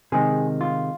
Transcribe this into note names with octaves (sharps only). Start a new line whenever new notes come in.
C3 D#3 G#3 G#4
F4